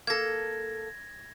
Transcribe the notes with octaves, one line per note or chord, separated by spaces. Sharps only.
A#3 A4 G#6 A#6